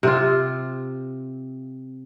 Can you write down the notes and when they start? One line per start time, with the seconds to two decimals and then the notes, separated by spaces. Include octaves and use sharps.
0.03 C3 C4 F4